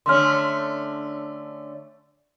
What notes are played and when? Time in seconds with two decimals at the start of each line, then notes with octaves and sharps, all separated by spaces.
0.06 D3 A3 C#4 C6 F6